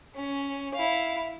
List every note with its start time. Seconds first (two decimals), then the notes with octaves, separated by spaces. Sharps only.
0.15 C#4
0.74 E4 F5